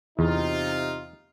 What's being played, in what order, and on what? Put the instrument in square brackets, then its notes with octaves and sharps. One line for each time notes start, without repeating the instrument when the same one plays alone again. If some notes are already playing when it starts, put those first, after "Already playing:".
[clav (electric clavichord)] E2 [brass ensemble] C3 D#4 F4